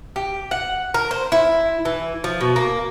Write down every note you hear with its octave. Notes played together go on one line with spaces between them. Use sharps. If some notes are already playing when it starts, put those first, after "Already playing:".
G4
F#5
A#4
C5
E4
E3
F3
B2
A#3